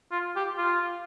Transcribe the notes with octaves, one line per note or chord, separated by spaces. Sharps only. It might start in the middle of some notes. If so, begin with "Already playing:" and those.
F4
G4
F4